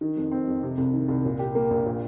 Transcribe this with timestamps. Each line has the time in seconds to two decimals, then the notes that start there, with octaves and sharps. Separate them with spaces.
0.01 D#3
0.17 F2
0.32 C4
0.48 F2
0.63 C3
0.78 C2
0.93 D#3
1.08 C2
1.25 A#2
1.39 G4
1.55 A#3
1.70 A#1
1.86 A#2